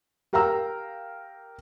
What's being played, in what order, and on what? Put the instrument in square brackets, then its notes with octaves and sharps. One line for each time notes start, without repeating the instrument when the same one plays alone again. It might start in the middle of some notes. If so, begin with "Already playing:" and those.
[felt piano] G4 A#4 F5 G5 A#5 E6